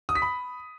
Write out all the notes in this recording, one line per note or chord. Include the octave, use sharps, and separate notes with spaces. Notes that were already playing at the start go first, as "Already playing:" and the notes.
D#6
B6
B5